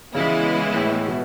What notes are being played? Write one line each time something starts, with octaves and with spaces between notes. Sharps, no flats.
C#3 E3 G#3 B3 E4
A2
B2